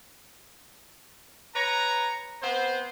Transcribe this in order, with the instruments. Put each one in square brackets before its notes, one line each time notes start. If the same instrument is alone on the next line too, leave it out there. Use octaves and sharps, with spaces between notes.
[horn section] B4 C#5 A#5
B3 C4 C5